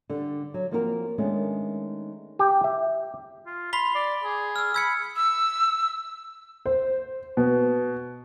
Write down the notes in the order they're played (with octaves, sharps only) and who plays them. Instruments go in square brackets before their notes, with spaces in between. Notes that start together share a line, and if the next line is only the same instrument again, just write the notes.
[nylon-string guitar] D3 G3
F#3
F3 A#3 C4 F#4 G#4 A#4
D#3 G#3 A3 B3 C#4 D4
[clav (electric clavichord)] G4
E5
[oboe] F4
[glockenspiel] B5 B6 G7 [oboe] C6
[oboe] D5
G#4
[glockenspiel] E6 F6
[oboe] B5 [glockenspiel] E6 G#6 C#7
[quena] E6
[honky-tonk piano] C5
B2